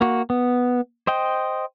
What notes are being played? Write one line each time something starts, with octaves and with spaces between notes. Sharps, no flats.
A#3 F#4
B3
C5 D#5 G5